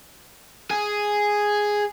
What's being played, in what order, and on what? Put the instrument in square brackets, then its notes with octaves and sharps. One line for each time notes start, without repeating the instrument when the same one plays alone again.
[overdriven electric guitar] G#4